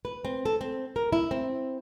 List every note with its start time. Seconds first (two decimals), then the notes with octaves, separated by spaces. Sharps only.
0.05 B4
0.25 C4
0.45 A4
0.61 C4
0.96 A#4
1.12 E4
1.31 C4